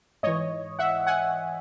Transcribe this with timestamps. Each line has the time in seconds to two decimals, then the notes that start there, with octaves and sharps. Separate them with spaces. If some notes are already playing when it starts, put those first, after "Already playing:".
0.23 G#2 E3 C#5 D#5
0.79 E5 F#5
1.07 F#5 G#5